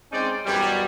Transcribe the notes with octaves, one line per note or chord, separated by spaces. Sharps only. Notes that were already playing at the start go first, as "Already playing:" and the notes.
G#3 C4 C#4 D#4 C5 D5
F#2 B2 E3 G3